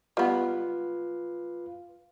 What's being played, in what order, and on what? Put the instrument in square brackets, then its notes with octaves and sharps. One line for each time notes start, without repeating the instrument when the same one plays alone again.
[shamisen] G3 B3 [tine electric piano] F4 B4 F5